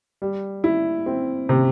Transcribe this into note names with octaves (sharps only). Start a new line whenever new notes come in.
G3
E4
C4
C3